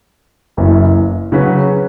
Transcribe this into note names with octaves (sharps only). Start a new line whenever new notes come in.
F#1 F#2 E3
C#3 F#3 C#4 F#4 B4